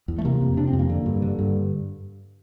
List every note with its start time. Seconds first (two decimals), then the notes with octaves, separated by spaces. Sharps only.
0.08 E2
0.18 A3
0.25 C3 A#3
0.41 F2
0.57 C3 D4
0.68 C4
0.73 F2
0.79 A#3
0.89 D3
1.06 G2
1.22 D3
1.39 G2